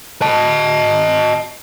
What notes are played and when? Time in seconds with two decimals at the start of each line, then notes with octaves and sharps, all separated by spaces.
0.22 D#5 A5